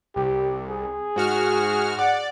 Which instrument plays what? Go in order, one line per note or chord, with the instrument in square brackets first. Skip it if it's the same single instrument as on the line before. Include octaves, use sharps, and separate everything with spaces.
[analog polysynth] C2 [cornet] G4
[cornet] G#4
[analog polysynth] G#2 F#4 F6
[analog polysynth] D5 [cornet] F#5